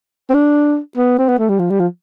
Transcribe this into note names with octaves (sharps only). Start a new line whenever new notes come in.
C4
D4
B3
C4
B3
A3
G3
F3
G3
F3